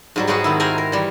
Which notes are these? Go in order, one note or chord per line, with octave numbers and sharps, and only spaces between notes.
G#2 F#3 G3
G#2 F#3 G#3 B3 D#4 F#4
D#3 C4 E4
A#4 C5 G#5 A#5 B5
A#4
E3 G3